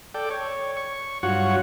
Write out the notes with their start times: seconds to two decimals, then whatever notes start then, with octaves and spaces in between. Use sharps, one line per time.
0.14 A4 D5 G5
0.31 C#5
0.77 C#6
1.23 G2 F#3 F4 F#4 C#5 F#5